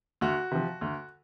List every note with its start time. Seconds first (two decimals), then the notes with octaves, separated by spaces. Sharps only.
0.21 D2 F#4
0.52 C3 F3
0.81 D2